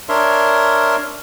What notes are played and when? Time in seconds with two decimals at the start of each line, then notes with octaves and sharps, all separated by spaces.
0.09 D4 A#4 C#5 E5 C6